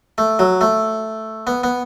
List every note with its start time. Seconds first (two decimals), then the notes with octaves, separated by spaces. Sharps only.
0.18 A3
0.39 F#3
0.61 A3
1.47 B3
1.64 B3